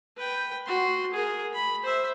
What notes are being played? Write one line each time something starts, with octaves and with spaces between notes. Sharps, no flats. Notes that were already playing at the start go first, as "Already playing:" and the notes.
B4 G5
F#4 C6
G#4 A#4
B5
C5 E5